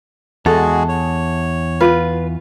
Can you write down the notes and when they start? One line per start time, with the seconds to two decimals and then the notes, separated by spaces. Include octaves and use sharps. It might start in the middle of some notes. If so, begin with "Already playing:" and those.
0.46 E2 G#3 F#4 G#4 A4
0.89 C#5
1.80 F4 B4